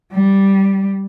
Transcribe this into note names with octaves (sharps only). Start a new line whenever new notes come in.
G3